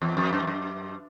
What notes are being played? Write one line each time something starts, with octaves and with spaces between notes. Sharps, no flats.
E2
F2
F#2
F2
F#2